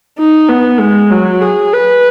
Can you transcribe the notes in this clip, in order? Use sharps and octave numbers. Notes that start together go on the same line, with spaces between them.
D#4
B3
G#3
F#3
G#4
B4